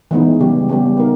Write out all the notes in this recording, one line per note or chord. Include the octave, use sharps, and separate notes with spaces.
E3 G#3 B3 D#4
C#3 G3 B3 G4
C#3 G3 B3 G4
B3 D#4 A#4